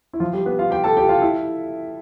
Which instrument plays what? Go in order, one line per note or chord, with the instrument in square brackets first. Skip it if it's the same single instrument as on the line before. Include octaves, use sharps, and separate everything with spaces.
[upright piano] E4
F3 F4
G3 G4
B3 B4
F4 F5
G4 G5
A4 A5
G4 G5
F4 F5
E4 E5